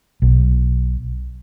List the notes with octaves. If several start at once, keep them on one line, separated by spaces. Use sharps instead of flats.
B1